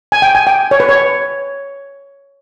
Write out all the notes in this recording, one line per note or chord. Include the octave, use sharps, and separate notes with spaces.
G#5
G5
G#5
G5
C#5
B4
C#5